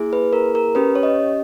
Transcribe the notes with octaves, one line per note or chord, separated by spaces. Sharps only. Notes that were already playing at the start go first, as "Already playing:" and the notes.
Already playing: A#3 E4 G#4
B4
A#4
A#4
C#4 G4 B4
C#5
D#5